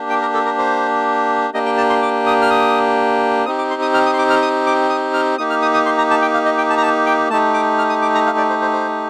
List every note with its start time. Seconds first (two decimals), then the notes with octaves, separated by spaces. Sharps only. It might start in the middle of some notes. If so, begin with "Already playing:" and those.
Already playing: A#3 D4 G4
0.10 G5
0.21 A#4
0.34 A4
0.46 A#4
0.58 C5
1.54 A#3 D4 G4 D#5
1.66 G5
1.77 A5
1.90 C6
2.02 D6
2.26 D#6
2.42 F6
2.50 D#6
3.45 C4 D#4 G4 D#6
3.58 D6
3.71 C6
3.82 D#6
3.94 F6
4.06 D#6
4.13 C6
4.19 D6
4.30 F6
4.42 D#6
4.66 D6
4.89 D#6
5.14 F6
5.38 A#3 D#4 G4 D#6
5.50 F6
5.62 D#6
5.74 D#6
5.86 C6
5.98 A#5
6.11 A5
6.22 G5
6.34 F5
6.45 D#5
6.58 G5
6.70 A5
6.77 A#5
6.82 A5
7.06 G5
7.30 A3 D#4 G4 A5
7.54 D6
7.78 F6
7.90 D#6
8.02 D6
8.15 A#5
8.26 F5
8.38 D5
8.50 C5
8.62 C5
8.73 C5